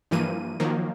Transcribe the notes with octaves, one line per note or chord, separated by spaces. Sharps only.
G2 E3 F3 A#3 D#7
D#3 F3 F#3 A#3